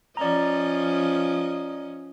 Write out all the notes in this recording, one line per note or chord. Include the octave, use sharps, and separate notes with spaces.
F3 C#4 D5 D#5 A#5